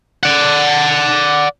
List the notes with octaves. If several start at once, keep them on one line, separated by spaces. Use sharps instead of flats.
D5 F#5